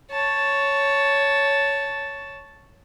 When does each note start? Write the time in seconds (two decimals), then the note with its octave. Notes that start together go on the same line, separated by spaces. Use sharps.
0.11 C#5 A5